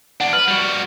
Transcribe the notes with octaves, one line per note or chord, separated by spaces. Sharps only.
E2 D4 F#5
B4 F6 F#7
G3 F#4